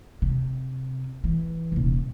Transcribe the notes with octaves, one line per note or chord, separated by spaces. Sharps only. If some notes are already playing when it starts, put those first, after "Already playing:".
C3
E3
D#1 C3